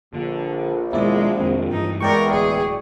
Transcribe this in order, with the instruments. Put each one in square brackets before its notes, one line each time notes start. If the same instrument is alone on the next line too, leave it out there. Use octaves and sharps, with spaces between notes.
[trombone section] A#1 [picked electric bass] D3
[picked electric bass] D#2 B2 [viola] G#3 [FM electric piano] E4 D5
[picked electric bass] F2 C3 D#3 [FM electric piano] C4
[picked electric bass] G2 E3 [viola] D#4
[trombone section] E2 [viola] G#3 A#4 [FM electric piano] D5 G5 C#6
[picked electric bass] D1 [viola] G#4